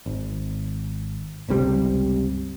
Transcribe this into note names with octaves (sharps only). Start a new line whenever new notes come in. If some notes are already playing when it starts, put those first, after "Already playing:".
G#1
G1 C#2 C3 G3